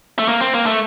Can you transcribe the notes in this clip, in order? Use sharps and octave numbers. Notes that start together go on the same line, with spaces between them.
A3
A#3
C4
A#3
A3